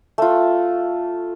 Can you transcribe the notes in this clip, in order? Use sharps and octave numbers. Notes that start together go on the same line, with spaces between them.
A3 F4